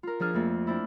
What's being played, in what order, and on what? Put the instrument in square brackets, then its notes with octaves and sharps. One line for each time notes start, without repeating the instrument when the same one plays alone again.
[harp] F4 A#4
F3 D4 G#4 F6
F2 A3 A#3 D4
C4 D4 E4